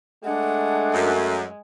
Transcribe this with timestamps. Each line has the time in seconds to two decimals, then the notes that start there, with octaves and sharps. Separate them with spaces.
0.24 G#3 A3 D4 F#5
0.94 F#2